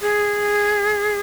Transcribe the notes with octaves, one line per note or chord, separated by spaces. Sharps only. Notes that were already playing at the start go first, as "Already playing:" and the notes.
G#4